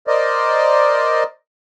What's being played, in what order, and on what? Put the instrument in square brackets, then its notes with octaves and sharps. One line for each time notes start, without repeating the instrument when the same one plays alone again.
[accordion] A#4 C5 D5 D#5